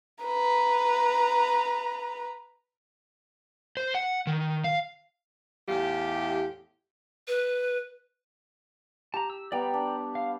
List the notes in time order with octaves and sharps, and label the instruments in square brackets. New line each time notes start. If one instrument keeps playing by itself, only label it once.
[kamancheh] B4 A#5
[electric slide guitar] C5
F#5
D#3
F5
[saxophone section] E2 A2 F4 G4
[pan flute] B4
[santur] G4 [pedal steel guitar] A5 A#5
[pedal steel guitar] E6
[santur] G3 B3 [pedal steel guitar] D5 G5 A#5
[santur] D4
[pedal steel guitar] F5